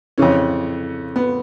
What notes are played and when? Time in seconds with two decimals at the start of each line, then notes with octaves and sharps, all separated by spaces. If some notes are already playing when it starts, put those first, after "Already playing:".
0.18 F2 C#3 E3 C#4
1.16 B3